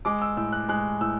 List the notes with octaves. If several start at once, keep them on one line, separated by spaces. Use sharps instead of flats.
G#3 D6
E6
A2 E6
F#6
G#3 F#6
A2 E6